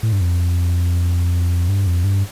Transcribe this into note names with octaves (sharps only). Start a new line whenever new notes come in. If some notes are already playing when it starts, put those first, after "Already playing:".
A2
G2
F2
G2
F2
G2